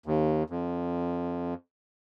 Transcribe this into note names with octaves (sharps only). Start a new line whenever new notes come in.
D#2
F2